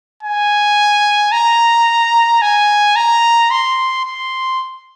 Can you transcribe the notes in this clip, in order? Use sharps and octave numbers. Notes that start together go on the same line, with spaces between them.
G#5
A#5
G#5
A#5
C6
C6